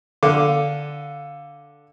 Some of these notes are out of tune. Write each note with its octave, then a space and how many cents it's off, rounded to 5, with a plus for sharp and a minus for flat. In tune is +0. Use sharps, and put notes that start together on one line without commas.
D3 +0 F5 +0 D6 +0